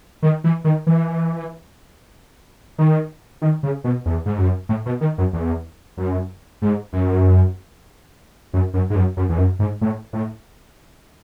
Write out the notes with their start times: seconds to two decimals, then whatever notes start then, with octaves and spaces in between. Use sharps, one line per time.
0.22 D#3
0.44 E3
0.64 D#3
0.87 E3
2.78 D#3
3.42 D#3
3.63 C#3
3.84 B2
4.06 E2
4.26 G#2
4.38 F#2
4.69 A2
4.86 B2
5.01 D#3
5.18 F#2
5.33 E2
5.97 F#2
6.62 G#2
6.93 F#2
8.53 F#2
8.74 F#2
8.90 G#2
8.95 F#2
9.17 F#2
9.29 E2
9.38 F#2
9.59 G#2
9.81 A2
10.13 A2